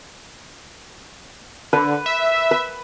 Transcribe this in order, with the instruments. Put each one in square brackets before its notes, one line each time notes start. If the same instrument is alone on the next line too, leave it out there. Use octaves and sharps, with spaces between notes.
[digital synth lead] D3 [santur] B4
[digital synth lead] E5
[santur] B4